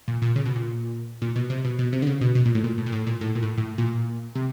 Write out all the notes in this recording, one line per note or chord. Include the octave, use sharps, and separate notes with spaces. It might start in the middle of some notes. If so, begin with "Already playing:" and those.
A#2
A#2
C#3
B2
A#2
A#2
B2
C3
B2
B2
C3
D3
C#3
B2
B2
A#2
A2
A#2
A2
A#2
A2
A#2
A2
A#2
A2
A2
A#2
C3